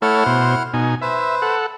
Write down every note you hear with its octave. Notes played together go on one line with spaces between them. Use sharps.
A3 E4 A4 C#5 F#5 F6
B2 C5
B2 D#4 G#5
B4 C5 E5
A4 F#5